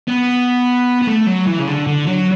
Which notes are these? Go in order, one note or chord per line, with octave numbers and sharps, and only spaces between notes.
B3
B3
A3
F#3
E3
C#3
D3
D3
F#3